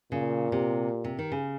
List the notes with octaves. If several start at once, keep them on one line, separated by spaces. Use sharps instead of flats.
A#2 C#3
C3
C3
D#3
C#3